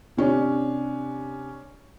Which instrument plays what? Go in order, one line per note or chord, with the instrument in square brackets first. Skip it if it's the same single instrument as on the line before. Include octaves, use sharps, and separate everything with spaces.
[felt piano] C3 C#4 D4